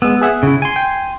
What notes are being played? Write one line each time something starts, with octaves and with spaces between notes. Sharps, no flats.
G#3 B3 E6
G#4 E5 F#5
C#3 E4
G#5 C6
G5